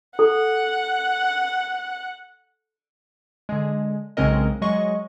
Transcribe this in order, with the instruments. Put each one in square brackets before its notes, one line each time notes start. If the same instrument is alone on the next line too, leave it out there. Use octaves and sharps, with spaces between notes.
[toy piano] A4 [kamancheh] F#5
[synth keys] D3 G#3
B1 C#3 G#3 C4 A#4 D#5
F#3 G#3 D#5 C#6